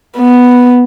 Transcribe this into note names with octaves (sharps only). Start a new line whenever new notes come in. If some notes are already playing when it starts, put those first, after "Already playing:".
B3